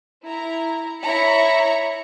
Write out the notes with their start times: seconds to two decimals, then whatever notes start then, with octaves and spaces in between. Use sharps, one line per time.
0.24 E4 A#5
1.02 E4 C#5 A#5 B5 C#7